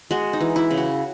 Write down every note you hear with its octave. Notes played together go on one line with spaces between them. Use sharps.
G#3 F#4
D#4
E3
E4
C#3
F#4